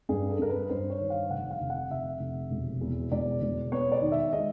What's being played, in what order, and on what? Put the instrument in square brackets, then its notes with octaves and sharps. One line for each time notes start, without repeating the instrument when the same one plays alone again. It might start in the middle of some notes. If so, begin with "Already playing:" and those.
[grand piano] G2 G#4
A4
G2 A#4
B4
G2 C5
C#5
D#3
F5
F1 F#5
F5
F1
F#5
F1 E5
F1
E1
E2
E1 D5
E1
B3 C#5
D5
D#3
E5
G#3 D#5